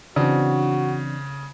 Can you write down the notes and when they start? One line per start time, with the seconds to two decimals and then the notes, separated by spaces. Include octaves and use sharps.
0.16 C#3 E3 C4 D4 F#4